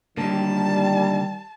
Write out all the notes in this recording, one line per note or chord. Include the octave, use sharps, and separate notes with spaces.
D3 D#3 G3 A#3 A5